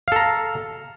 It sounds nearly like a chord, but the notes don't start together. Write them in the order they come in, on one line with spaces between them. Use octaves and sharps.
F5 A4 A#5